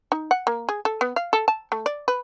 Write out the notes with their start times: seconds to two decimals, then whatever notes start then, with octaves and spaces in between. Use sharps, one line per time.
0.12 D#4
0.31 F#5
0.47 A#3
0.69 G#4
0.85 A4
1.01 B3
1.16 F5
1.33 A4
1.48 A5
1.72 A3
1.86 D5
2.08 B4